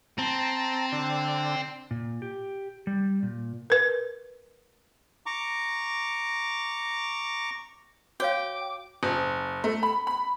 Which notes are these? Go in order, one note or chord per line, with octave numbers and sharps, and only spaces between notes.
C4 A5 A#5
D3
A#2
G4
G3
A#2
A#4 B4
A#5 C#6 D6
F#4 C#5 F5 G5 D6
F#1
A3
B5
B5